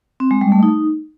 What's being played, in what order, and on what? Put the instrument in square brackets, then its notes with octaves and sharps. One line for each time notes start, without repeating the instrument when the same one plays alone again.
[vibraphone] C4
G#3
G3
A3
D#4